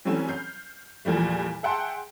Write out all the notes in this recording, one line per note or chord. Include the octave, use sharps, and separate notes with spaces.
E3 F#3 G3 A3 C4 C#4
F6 G6 C7
E2 A#2 F3 G3 A3
G#4 E5 F#5 G5 A5 C6